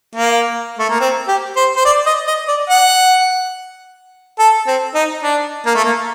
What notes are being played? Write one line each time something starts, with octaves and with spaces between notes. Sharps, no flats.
A#3
A3
A#3
C4
G4
C5
C5
D5
D#5
D#5
D5
F#5
A4
C4
D#4
D4
A#3
A3
A#3